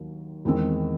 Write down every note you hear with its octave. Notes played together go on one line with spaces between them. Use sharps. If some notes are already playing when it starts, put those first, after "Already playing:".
Already playing: D#2 D#3 F#3
E2 D#3 G#3 C4